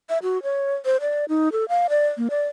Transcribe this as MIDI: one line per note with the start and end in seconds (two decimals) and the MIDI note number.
0.09 0.18 76
0.23 0.42 66
0.43 0.75 73
0.85 0.97 72
1.01 1.25 74
1.29 1.49 63
1.52 1.68 69
1.69 1.87 77
1.90 2.07 74
2.17 2.28 58
2.30 2.44 74